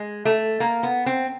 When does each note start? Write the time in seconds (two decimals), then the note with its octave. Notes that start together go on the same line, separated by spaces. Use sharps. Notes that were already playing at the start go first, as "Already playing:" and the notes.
Already playing: G#3
0.25 A3
0.60 A#3
0.83 B3
1.06 C4